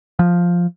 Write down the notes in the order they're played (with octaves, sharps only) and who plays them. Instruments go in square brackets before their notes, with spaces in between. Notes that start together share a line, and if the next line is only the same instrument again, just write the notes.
[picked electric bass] F3